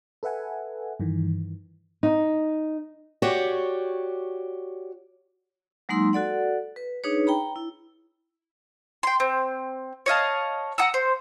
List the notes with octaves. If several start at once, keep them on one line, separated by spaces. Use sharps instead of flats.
A4 B4 E5 F#5 G#5
G2 D#3 E3
D#4
F#4 G4 C#5 D5
F#3 G#3 A#3 D#4 C6 E6
F#4 A4 D5 F#5
B4
D4 D#4 G#4 B4 C#5
G5 A#5 B5
E4
G5 C6
C4
C#5 D#5 F5 A5
F#5 A#5 D#6 E6
C5